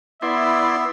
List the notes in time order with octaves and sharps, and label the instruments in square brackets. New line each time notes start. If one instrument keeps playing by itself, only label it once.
[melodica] B3 [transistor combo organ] E4 D5 C6 [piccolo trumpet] E5